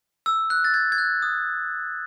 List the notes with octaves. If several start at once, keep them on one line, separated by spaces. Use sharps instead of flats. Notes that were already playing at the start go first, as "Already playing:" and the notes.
E6
F#6
A6
G#6
G#6
F#6
D#6